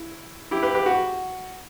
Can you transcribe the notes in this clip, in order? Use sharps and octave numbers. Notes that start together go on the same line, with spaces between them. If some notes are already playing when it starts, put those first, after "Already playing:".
Already playing: E4
E4 G4
G4 B4
G4 B4
F#4